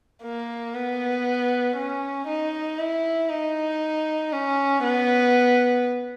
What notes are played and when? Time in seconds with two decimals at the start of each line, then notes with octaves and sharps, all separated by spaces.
0.23 A#3
0.75 B3
1.76 C#4
2.27 D#4
2.79 E4
3.30 D#4
4.32 C#4
4.83 B3